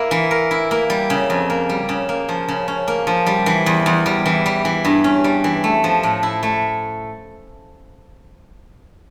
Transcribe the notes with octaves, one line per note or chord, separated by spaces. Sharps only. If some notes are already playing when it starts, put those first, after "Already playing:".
Already playing: A#3 E4
E3
A#4
E4
A#3
G3
C#3
F2
A#3
G3
C#3
A#3
F3
C#3
C#4
A#3
F3
G3
E3
E2
E2
G3
E3
G3
E3
G2
C#4
G3
E3
A3
F3
A2
E4
A3